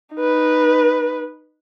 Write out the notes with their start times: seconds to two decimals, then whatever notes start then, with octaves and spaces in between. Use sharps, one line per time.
0.15 D#4 B4